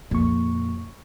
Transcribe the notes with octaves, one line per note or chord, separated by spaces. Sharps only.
F2 A#2 C#6